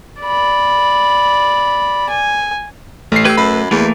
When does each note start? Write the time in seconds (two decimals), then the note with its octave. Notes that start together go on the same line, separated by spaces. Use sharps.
0.22 D5 B5
2.09 G#5
3.12 A1 A3 C7
3.25 G4 B4 E6 G#6
3.37 F#2 B5
3.71 E2 E3 A3 A#3